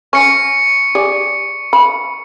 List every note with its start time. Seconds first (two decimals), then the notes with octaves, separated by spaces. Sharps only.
0.13 C#4 C#6 C#7
0.95 G4 G#4 D5
1.73 B5